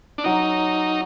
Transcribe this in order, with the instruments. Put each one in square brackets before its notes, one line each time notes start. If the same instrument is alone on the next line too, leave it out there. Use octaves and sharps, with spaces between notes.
[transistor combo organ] D4
[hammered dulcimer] F#3 [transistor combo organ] D#4